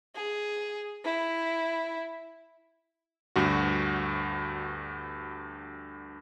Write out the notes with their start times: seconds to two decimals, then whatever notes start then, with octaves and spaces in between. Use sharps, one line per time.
0.15 G#4
1.04 E4
3.36 D2 G2 F#4